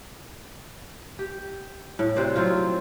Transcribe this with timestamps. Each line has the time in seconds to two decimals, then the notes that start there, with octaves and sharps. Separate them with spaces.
1.19 G4
1.99 A2
2.16 C3 F#4 C5 D5
2.36 F#3 C4 F4